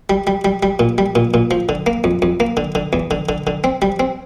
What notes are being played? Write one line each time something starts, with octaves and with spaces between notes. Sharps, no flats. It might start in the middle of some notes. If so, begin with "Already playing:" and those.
G3
G3
G3
G3
A#2
G3
A#2
A#2
F3
D3
A#3
F2
F2
A#3
D3
D3
E2
D3
D3
D3
C4
G3
C4